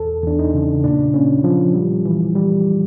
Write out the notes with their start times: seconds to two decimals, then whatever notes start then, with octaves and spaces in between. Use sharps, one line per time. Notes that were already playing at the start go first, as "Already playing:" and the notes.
Already playing: E2 A4
0.24 E2 D4
0.39 D#4
0.54 C#3
0.84 A#2 D4
1.14 A#2 C#4
1.44 F3
1.74 G3
2.05 E3
2.35 G3